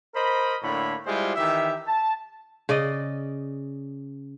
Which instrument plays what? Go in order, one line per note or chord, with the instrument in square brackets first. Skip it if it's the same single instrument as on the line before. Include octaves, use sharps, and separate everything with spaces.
[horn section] A#4 C5 D#5 B5
A2 D3 A#3 C#5 B5
G3 G#3 E4 F4 C5
D#3 E3 G4 E5
A5
[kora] C#3 D5 D#5